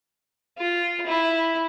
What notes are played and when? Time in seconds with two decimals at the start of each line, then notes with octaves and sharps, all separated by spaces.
0.58 F4
1.06 E4